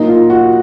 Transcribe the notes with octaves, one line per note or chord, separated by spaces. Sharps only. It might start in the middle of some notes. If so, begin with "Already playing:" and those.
Already playing: A#2 F#3 A#3 D#4
F4
F#4